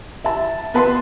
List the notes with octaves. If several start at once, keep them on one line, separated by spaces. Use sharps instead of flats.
E5 A5
B3 B4 A5 C6